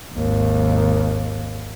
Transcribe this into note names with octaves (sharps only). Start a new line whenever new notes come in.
G#1 D#2